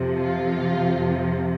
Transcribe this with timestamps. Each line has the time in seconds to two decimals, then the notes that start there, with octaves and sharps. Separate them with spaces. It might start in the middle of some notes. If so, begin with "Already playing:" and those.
Already playing: F2 C3 F3
0.17 F4